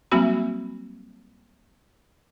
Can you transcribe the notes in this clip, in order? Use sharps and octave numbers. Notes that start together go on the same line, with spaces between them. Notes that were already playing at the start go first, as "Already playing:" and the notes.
F#3 G3 A#3 C4 F#4 B5